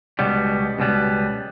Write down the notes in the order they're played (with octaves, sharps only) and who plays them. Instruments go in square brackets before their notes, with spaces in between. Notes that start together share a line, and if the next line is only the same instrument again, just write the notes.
[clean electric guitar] C#2 B2 G3 B3
C#2 B2 G3 B3